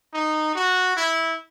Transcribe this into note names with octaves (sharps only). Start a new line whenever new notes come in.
D#4
F#4
E4